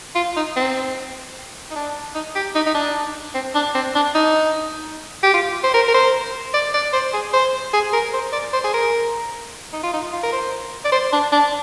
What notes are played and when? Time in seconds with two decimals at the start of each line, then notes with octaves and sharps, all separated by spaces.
0.16 F4
0.37 D#4
0.56 C4
1.71 D#4
1.76 D4
2.15 D#4
2.36 G4
2.55 D#4
2.66 D#4
2.75 D4
3.35 C4
3.55 D4
3.75 C4
3.95 D4
4.15 D#4
5.23 G4
5.34 F4
5.64 C5
5.74 A#4
5.88 A#4
5.94 C5
6.54 D5
6.74 D5
6.93 C5
7.14 G#4
7.33 C5
7.74 G#4
7.93 A#4
8.14 C5
8.33 D5
8.53 C5
8.65 G#4
8.74 A#4
9.73 D#4
9.84 F4
9.94 D#4
10.13 F4
10.23 A#4
10.33 C5
10.85 D5
10.92 C5
11.13 D4
11.32 D4